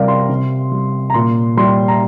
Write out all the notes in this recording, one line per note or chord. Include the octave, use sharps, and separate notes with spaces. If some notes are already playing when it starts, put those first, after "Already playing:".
Already playing: C3 G3 A#4 D5 F5
C6
C3
G3
A#5
A#2 C6
G3 C6
A#5